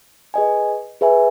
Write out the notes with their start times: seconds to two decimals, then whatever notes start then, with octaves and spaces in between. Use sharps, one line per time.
0.34 G#4 B4 D#5 G#5
1.01 G#4 B4 E5 G#5